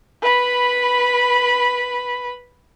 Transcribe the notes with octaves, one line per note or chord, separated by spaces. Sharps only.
B4 B5